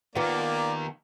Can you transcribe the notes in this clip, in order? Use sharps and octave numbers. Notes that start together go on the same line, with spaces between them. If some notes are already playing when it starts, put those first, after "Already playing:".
D#2 D#3 A#3 B3 F4 D5